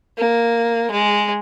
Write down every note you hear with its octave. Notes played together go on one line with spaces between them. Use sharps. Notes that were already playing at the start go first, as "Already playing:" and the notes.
A#3
G#3